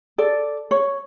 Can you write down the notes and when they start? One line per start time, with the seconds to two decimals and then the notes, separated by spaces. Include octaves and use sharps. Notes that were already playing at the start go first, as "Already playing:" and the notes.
0.18 A4 D5
0.71 C#5